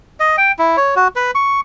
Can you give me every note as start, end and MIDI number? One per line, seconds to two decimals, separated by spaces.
0.20 0.36 75
0.38 0.52 79
0.59 0.77 64
0.77 0.95 73
0.96 1.08 66
1.16 1.31 71
1.35 1.60 85